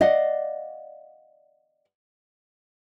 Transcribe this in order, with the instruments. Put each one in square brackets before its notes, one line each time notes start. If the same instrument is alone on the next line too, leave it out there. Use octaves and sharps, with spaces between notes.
[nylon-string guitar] D5 D#5 F5 F#5